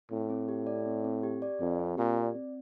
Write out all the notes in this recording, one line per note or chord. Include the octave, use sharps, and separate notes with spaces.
A2 C4
C4
G4
D5
C4
C4
G4
D5
F2 C4
C4
A#2 G4
D5
C4